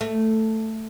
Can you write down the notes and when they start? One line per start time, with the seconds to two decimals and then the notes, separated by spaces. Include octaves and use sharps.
0.01 A3